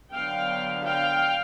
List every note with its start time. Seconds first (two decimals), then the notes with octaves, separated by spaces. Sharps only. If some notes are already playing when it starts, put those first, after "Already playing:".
0.11 D3 F#3 B3 F5 G5
0.84 F5 G5